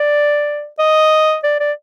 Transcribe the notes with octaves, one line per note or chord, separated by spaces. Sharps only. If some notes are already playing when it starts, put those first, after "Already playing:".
Already playing: D5
D#5
D5
D5